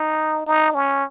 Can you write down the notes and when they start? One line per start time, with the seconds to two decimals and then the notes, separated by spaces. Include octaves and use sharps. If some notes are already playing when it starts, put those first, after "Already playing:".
Already playing: D#4
0.47 D#4
0.74 C#4